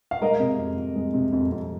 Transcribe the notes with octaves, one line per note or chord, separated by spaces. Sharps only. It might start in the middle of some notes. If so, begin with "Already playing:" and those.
F5
G#3 A#4 D#5
C3
F2
F2
G#3
C3
F2
F2